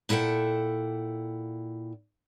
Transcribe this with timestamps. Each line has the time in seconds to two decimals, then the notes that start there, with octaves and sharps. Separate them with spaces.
0.09 A#2 E4 A4 F#5 G5